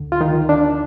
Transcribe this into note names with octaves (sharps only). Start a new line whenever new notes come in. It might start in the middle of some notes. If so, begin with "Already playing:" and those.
Already playing: D2 D3
F4
D#3 D#4
D4